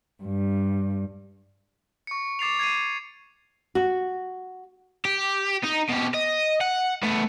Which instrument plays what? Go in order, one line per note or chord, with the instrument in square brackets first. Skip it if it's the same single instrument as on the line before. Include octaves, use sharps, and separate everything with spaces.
[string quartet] G2
[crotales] C#6 C#7
D6 A6 C7 F7
G#6 C7 D#7
[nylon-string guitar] F#4
[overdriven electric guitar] G4
D#4
B2 G4
D#5
F#5
A3 B3